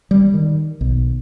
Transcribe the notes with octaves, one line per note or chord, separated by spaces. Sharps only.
G3
D#3
B1